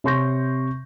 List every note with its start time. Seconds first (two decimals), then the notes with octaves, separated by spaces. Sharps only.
0.04 C3 C#5 C6 C#6 G6 A#6